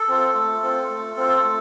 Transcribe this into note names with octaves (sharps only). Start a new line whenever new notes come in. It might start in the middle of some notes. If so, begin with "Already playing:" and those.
Already playing: A4
C4 F4
A3
C4 F4
A3
C4 F4
A3